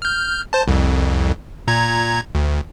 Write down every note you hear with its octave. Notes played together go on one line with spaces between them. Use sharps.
F6 G6
C5 A5
C2 F2
A#2 A#5 G#6
D2